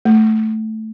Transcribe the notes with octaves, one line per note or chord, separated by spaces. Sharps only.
A3